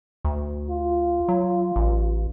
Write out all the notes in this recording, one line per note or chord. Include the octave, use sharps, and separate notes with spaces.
D2
F4
F#3
A1